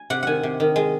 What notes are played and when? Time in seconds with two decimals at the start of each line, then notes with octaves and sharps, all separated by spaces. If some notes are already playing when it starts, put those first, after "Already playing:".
Already playing: G#5
0.10 C3 F#5
0.23 D#3 F#5 G#5
0.43 C3
0.60 D#3
0.76 G#3